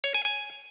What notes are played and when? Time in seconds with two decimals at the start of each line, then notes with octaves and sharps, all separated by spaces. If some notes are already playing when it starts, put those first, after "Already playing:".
0.04 C#5
0.14 G#5
0.25 G#5